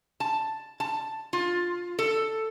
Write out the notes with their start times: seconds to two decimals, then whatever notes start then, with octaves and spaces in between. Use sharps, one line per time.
0.20 A5
0.80 A5
1.33 F4
1.99 A4